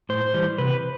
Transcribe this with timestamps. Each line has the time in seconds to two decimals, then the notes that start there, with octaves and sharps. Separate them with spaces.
0.09 A2 C5
0.34 E3 G3
0.58 C3 B4